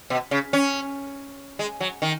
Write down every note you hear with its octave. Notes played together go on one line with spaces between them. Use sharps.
B2
C#3
C#4
G#3
F#3
D#3